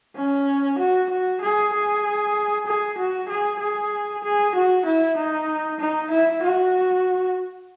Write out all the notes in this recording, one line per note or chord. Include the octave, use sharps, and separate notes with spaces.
C#4
F#4
F#4
G#4
G#4
G#4
F#4
G#4
G#4
G#4
F#4
E4
D#4
D#4
E4
F#4